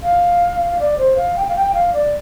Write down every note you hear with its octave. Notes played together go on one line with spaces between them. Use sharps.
F5
F5
D5
C5
F5
G5
F5
G5
F5
D5